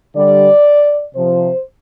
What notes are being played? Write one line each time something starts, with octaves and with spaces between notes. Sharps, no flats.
D3 G3 D5
C3 F3 C5